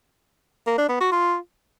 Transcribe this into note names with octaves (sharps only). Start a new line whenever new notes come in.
A#3
D4
B3
F#4
F4